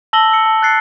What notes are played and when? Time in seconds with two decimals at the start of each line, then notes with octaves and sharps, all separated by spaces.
0.13 A5 E6 A#6 F#7 G7
0.32 E6 C#7
0.46 A5
0.62 F#6 A6 C7 C#7